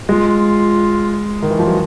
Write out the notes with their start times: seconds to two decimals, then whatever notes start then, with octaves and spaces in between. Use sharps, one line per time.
0.08 G#3 F4
1.42 D#3
1.50 E3
1.59 F3
1.67 F#3